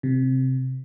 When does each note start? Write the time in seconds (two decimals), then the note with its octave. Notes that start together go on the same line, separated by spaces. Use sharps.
0.03 C3